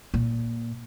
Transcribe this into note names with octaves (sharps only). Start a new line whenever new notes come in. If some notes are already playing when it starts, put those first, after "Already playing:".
A#2